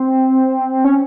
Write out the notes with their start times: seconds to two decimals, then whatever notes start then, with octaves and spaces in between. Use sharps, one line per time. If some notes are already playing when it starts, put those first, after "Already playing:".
Already playing: C4
0.84 C#4